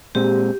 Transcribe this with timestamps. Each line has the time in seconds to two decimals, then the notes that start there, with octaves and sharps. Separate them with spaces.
0.15 A#2 G#3 C4 G4